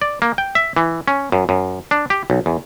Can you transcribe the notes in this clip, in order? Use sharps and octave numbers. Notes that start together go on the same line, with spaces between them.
D5
A#3
G5
E5
E3
C#4
F#2
F#2
D4
G4
B1
E2